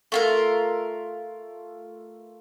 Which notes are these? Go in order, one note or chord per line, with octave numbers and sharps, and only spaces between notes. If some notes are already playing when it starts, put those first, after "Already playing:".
A3 F4 A#4